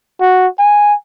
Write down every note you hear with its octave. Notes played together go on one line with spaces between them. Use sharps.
F#4
G#5